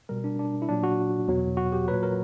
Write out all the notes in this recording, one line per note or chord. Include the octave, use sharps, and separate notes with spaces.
B2 G3 A#4
D4
D4
E4
A#2 F#3 D4
F#4
E2 B2 F#3
F#4
G4
A#2 F#3 B4
A#4